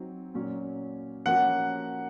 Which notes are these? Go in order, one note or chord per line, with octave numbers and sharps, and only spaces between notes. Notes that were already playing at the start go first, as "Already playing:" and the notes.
Already playing: F#3 C4 D#4
A#2 F#3 C#4
F3 A#3 C#4 F#4 F#5